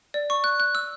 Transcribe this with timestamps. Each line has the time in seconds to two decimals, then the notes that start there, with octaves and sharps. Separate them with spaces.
0.14 D5
0.30 C#6
0.44 F#6
0.60 F#6
0.75 E6